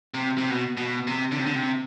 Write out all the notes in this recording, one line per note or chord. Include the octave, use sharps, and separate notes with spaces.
C3
C3
B2
B2
C3
D3
C3
D3
C3